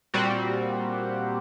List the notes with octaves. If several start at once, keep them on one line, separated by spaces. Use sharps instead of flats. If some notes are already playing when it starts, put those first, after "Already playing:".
A#2 G3 C4 F#4